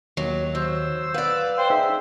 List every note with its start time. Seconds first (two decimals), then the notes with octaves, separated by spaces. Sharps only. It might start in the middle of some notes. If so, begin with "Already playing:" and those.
0.17 D#2 F#3
0.55 F#3 C5 E6
1.14 B4 D5 F5 F#5
1.58 C5 G5
1.70 D#4 G#4 E5 F#5